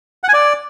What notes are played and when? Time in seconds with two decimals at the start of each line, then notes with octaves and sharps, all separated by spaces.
0.24 F#5
0.29 G#5
0.34 D5